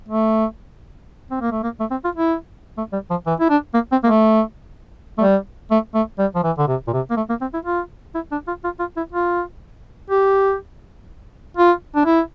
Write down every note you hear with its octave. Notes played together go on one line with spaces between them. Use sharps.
A3
C4
A#3
A3
A#3
A3
C4
F4
E4
A3
G3
F3
E3
E4
D4
A#3
C4
A#3
A3
A3
G3
A3
A3
G3
F3
E3
D3
C3
A#2
C3
A#3
A3
A#3
C4
E4
F4
E4
D4
F4
F4
F4
E4
F4
G4
F4
D4
E4